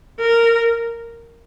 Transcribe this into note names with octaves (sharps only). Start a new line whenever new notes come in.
A#4